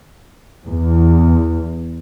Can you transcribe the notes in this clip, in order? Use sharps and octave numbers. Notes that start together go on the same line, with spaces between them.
E2